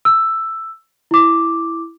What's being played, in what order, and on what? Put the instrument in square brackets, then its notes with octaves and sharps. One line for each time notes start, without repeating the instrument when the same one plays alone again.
[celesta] E6
E4 D6